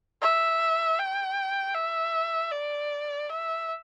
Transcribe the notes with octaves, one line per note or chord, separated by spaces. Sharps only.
E5
G5
E5
D5
E5